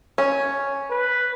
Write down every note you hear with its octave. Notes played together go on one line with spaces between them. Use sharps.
C#4
B4